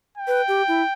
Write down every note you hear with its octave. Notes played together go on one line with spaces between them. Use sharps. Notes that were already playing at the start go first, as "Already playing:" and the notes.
G5
B4
G4
E4